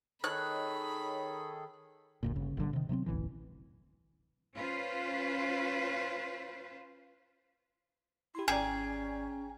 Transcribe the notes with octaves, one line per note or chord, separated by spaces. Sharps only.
D#3 G#4 A4 C#5 D#5 B5 F#6
F#1 D2 A#2
G1 C#3
G1 A#2 D3 G3
C3 D#3
C3 F#3 A#3 C4
E1 A1 D2 E3
C#4 F4 B4 C5
E4 G4 C6
G#1 C#4 G#4 D5 G5 A#5